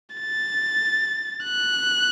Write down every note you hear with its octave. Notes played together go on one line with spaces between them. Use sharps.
A6
F#6